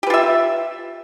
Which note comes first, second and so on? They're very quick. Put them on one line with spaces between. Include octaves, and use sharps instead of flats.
G4 B4 F4 E5